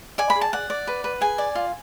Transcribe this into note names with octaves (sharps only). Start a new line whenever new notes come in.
D5 G#5
B5
G#4
A5
D5 F#5
D5
B4
B4
G#4 G#5
D5
F4